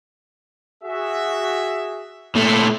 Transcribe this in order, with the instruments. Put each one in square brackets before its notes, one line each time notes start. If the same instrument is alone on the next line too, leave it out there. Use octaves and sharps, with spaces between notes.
[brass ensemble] F#4 G#4 E5
[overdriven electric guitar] A#2 A3 [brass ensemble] B3 C4 G4